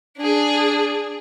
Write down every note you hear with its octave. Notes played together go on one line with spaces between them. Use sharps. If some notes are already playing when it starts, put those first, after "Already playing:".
D4 G#4